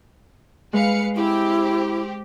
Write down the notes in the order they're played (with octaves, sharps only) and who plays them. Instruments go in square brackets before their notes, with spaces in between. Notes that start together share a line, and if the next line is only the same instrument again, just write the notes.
[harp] G#3 [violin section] B4 F5 C#7
[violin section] C4 G4 [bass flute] E4